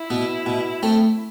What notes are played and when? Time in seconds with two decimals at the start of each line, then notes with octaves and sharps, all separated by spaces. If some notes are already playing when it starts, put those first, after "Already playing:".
Already playing: E4
0.10 B2 B3
0.46 B2
0.83 A3 C4